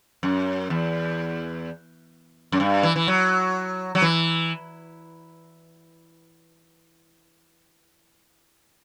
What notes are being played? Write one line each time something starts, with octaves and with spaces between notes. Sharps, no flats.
F#2
E2
F#2
G2
E3
E3
F#3
F#3
E3